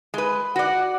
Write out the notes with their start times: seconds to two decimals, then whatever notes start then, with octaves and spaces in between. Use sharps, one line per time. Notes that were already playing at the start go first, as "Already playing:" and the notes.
0.14 G#3 B4
0.56 F#4 D5 F#5